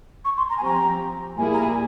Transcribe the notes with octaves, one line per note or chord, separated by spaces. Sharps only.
C#6
C6
A#5
G#5
F3 C4 G4 A#5
A#2 G3 A#3 E4 G#4 G#5
A#5
G#5